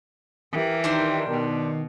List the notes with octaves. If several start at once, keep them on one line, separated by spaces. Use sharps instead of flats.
E3 G4 A#4 G5
D#3 D4 C5 C6
B2